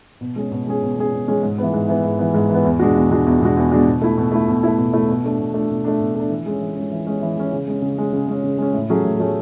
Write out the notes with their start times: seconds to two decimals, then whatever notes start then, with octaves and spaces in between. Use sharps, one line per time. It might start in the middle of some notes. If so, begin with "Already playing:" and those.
0.21 B2
0.36 G#3 C#4 G#4
0.51 B2
0.67 G#3 C#4 G#4
0.83 B2
0.97 G#3 C#4 G#4
1.13 B2
1.28 G#3 C#4 G#4
1.43 G#2
1.58 E3 B3
1.74 G#2
1.88 E3 B3
2.03 G#2
2.18 E3 B3
2.34 G#2
2.49 E3 B3
2.64 E2
2.79 B2 G#3 D4 F#4
2.95 E2
3.11 B2 G#3 D4 F#4
3.26 E2
3.40 B2 G#3 D4 F#4
3.57 E2
3.71 B2 G#3 D4 F#4
3.87 B2
4.02 A3 E4
4.18 B2
4.32 A3 E4
4.48 B2
4.63 A3 E4
4.78 B2
4.93 A3 E4
5.09 B2
5.24 A3 D4
5.38 B2
5.54 A3 D4
5.70 B2
5.84 A3 D4
6.00 B2
6.15 A3 D4
6.30 E3
6.46 G#3 C#4
6.61 E3
6.76 G#3 C#4
6.91 E3
7.07 G#3 C#4
7.21 E3
7.37 G#3 C#4
7.53 C#3
7.67 G#3 C#4
7.82 C#3
7.98 G#3 C#4
8.13 C#3
8.28 G#3 C#4
8.44 C#3
8.58 G#3 C#4
8.73 A2
8.90 F#3 A3 C#4 G#4
9.04 A2
9.19 F#3 A3 C#4 G#4